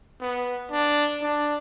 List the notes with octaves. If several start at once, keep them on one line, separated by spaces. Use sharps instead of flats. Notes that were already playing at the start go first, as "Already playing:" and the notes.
B3
D4
D4